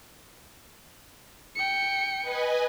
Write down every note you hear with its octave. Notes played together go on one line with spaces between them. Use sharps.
G5 C#7
B4 D#5 G#5